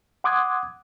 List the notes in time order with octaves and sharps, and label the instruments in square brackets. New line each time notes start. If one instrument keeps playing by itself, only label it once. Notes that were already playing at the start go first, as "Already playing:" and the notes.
[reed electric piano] F#5 C6 D6 D#6 F#6 G#6